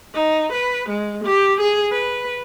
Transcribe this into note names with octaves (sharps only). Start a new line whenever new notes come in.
D#4
B4
G#3
G4
G#4
B4